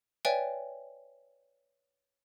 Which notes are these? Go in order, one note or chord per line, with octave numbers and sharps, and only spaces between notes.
B4 C#5 D5 E5 G5 G#5